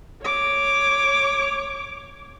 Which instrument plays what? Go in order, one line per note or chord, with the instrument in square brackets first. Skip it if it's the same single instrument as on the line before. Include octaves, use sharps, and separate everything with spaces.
[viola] C#5 D6